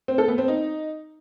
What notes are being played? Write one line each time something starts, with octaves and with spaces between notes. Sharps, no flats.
C4
A4
B3
C4
D#4